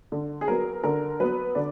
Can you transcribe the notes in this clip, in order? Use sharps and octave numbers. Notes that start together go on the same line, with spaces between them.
D3
G#4
F#3 B3 A#4
D3 A#4
F#3 B3 B4
D3 D5